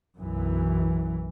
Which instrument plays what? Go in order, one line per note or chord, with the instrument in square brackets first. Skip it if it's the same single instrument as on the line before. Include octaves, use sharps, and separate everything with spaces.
[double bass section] B1 F#2 E3